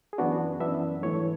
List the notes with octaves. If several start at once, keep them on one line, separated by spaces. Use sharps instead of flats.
G#4
F#2 E3 B3 D4 F#4
F#2 E3 B3 D4 E5
G#2 E3 A3 C#5